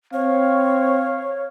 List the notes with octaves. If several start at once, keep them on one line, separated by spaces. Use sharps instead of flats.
C4 C#5 F5